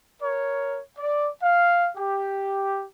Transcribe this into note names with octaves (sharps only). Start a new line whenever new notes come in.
A#4 C#5
D5
F5
G4